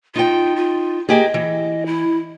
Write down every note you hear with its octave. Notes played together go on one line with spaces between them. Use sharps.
D#4 F4 G5
F4
A#3 G4 G#4 D#5
E3
E4